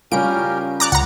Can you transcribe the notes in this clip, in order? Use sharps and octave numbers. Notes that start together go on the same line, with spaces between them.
C#3 G3 C#4 F4 G4 A#4 D7
D5 A#5 D6 F#6
C#2 F#5 A#5